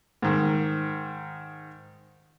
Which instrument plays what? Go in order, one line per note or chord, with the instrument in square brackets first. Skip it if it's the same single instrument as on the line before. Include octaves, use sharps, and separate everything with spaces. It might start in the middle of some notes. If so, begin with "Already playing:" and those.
[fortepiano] G#2 D#3